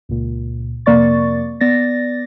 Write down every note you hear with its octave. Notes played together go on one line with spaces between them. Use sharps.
C#2 A#2
F2 C3 A#3 D5 C#6 A6
B3 D5 A6 A#6